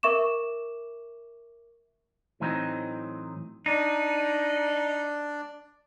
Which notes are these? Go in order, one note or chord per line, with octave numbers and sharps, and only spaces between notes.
A#4 E5 C#6 D6 E7
A2 E3 F#3 C4 D#4
D4 D#4 D5